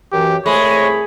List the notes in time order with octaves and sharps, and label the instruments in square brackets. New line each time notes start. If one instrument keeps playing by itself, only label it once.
[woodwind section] F#2 E3 [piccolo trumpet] G4
[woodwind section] C2 A3 B5 [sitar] G#3 [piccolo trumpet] C#5